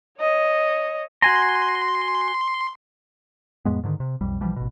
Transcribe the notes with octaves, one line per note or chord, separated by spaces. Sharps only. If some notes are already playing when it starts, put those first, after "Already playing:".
C#5 D#5
F#4 G#5 A#5 C6
F2 A2 G#3 B3
G#2 D3 D#3
C3
B1 F2 G3
B1 E3 F3 G3
A1 B2